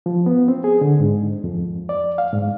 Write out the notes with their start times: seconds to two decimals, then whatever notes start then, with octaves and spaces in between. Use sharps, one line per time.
0.06 F3
0.26 B3
0.48 C4
0.64 G#4
0.81 D3
1.00 G#2
1.44 F2
1.89 D5
2.18 F5
2.33 G#2